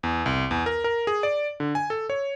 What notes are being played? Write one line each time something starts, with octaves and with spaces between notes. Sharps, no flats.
E2
C2
E2
A#4
A#4
G#4
D5
D3
G#5
A4
C#5